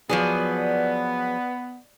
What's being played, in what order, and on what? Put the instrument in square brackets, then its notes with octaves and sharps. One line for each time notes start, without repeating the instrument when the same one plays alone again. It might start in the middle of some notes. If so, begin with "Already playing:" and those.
[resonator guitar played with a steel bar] F3 F#3 G#4 [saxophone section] B3 [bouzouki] D5